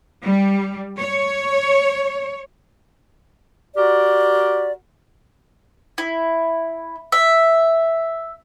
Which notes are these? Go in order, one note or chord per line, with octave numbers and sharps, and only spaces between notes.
G3
C#5
F#4 G4 A#4 D5
E4
E5